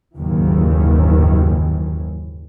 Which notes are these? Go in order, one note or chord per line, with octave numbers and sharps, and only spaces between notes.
F#1 D#2 G#2 D#3 E3 F#3